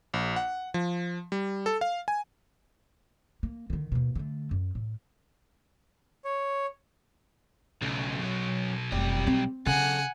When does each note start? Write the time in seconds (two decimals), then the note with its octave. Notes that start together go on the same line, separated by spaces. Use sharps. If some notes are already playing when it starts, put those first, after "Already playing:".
0.14 A#1
0.36 F#5
0.74 F3
1.32 G3
1.66 A4
1.81 F5
2.08 G#5
3.43 A#3
3.70 D3 D#3
3.92 D#2 B2
4.15 D3 A3
4.51 F#2
4.75 A2
6.25 C#5
7.82 B1 C#3 A3
8.19 F#2 F#3
8.92 F1 G3 D5
9.27 C4
9.66 C#3 A4 F5 F#5 G#5